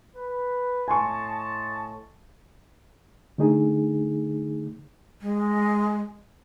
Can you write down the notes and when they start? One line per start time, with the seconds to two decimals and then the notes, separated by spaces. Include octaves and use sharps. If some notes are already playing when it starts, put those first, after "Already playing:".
0.16 B4
0.88 A2 D#5 G#5 A5 C6 C#6
3.38 D3 A3 D#4 G#4
5.22 G#3